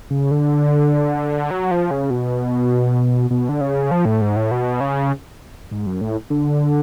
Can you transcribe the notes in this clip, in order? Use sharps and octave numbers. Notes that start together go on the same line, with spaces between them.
C#3
D3
F#3
F3
C#3
B2
B2
D3
C#3
F3
A2
G#2
A2
B2
C#3
G#2
F#2
A2
D3